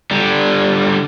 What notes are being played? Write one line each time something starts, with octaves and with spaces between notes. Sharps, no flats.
D3 G3